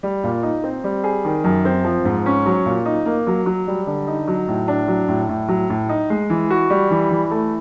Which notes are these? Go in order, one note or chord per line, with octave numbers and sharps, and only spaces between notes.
G3
A#2
D#4
C4
G3
G#4
D#3
F#2
C4
F3
G#2
C#4
F#3
A#2
D#4
A#3
F#3
F#3
G3
D3
D#4
F#3
A2
D4
F#3
A2
A2
F#3
A2
D#4
G#3
E3
F#4
G3
E3
E3
A3